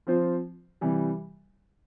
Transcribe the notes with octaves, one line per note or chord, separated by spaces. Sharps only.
F3 C4 F4 C5
C3 E3 G3